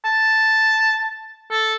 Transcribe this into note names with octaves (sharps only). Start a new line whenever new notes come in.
A5
A4